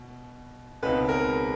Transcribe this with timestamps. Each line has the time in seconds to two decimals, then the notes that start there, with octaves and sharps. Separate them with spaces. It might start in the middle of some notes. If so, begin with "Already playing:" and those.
Already playing: B2
0.82 C#2 B2 G#3 C4 D#4 B4
1.09 A#4